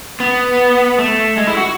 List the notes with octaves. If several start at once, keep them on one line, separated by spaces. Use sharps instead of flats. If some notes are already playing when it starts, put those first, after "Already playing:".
B3
A3
G#3
E4
F#4